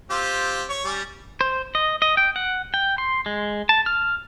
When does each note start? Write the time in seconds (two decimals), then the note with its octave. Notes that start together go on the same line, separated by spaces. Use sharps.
0.10 C4 F4 G4
0.69 C#5
0.85 G3 C#4
1.41 C5
1.75 D#5
2.02 D#5
2.17 G5
2.36 F#5
2.74 G5
2.98 C6
3.26 G#3
3.69 A5
3.86 F6